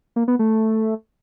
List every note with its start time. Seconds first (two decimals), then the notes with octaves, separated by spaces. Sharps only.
0.16 A#3
0.28 B3
0.39 A3